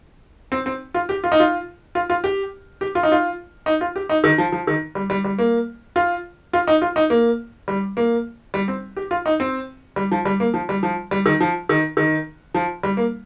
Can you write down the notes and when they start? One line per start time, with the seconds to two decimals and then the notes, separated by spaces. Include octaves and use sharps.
0.52 C4
0.66 C4
0.94 F4
1.09 G4
1.24 F4
1.32 D#4
1.40 F4
1.95 F4
2.10 F4
2.24 G4
2.81 G4
2.95 F4
3.03 D#4
3.12 F4
3.66 D#4
3.81 F4
3.96 G4
4.09 D#4
4.24 D#3
4.38 F3
4.52 F3
4.67 D#3
4.95 G3
5.10 G3
5.24 G3
5.39 A#3
5.96 F4
6.53 F4
6.68 D#4
6.82 F4
6.96 D#4
7.10 A#3
7.68 G3
7.97 A#3
8.54 G3
8.68 C4
8.97 G4
9.11 F4
9.26 D#4
9.40 C4
9.96 G3
10.12 F3
10.25 G3
10.40 A#3
10.54 F3
10.69 G3
10.83 F3
11.11 G3
11.26 D#3
11.41 F3
11.69 D#3
11.97 D#3
12.55 F3
12.83 G3
12.97 A#3